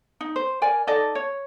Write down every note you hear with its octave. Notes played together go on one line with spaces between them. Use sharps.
D#4
C5
A#4 D5 G#5
D#4 A4 D5 D#5
C#5